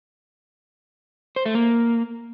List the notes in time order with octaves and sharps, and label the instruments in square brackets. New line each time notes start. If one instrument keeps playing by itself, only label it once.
[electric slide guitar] C5
A3
A#3